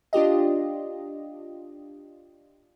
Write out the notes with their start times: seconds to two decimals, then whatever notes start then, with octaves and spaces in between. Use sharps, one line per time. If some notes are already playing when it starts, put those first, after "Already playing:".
0.13 D4 F4 G4 D#5